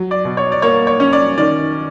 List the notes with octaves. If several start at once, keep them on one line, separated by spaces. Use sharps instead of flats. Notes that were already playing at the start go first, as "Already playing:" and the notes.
Already playing: F#3
D5
B2
C#5
D5
A#3 C#5
C#5
C#4
D5
D#3 D5